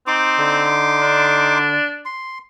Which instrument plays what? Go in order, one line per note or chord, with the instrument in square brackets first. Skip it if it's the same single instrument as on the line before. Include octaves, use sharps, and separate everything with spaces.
[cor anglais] C4 [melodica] D#4 C6 D6
[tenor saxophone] D3
[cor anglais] D4
[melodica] C6